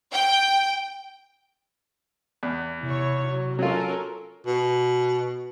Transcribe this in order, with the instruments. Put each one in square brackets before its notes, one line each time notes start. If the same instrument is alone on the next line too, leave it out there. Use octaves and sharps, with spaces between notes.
[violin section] G5
[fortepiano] E2
[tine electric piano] C3 [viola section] E4 C#5
[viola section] F#3
[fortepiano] F#3 F4 [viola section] C#4 A4 A#4
[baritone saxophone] B2